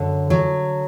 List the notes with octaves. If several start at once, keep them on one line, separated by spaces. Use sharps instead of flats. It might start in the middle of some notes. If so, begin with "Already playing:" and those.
Already playing: F#2 D3
F#3